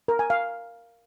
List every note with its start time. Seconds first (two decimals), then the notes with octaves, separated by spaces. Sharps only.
0.08 A#4
0.19 G#5
0.30 F5